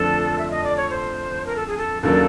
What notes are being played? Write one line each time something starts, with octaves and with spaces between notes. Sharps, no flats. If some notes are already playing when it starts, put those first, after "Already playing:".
Already playing: F2 D3 F3 A3 D4 A4
E5
D#5
D5
C#5
C5
A#4
A4
G#4
A4
D#2 C#3 F#3 A#3 D4 A4